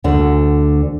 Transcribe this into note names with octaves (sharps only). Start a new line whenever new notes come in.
D2 D3